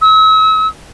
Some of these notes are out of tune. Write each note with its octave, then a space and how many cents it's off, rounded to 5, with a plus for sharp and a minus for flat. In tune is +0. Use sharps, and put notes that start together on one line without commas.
E6 -40